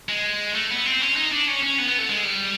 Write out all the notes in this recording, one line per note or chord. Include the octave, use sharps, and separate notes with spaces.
G#3
A3
B3
C4
C#4
D#4
D4
C#4
C#4
B3
B3
A3
G#3
G3